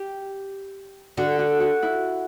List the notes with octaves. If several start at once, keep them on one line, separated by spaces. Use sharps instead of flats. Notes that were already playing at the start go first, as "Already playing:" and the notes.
Already playing: G4
D3 F#4
F#4
F#4
E4